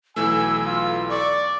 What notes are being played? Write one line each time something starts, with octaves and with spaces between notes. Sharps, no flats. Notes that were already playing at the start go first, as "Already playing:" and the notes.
B1 E3 A3 G#5 E6
F4
D5 C#6